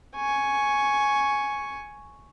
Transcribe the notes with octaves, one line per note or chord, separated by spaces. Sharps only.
G#5 C#6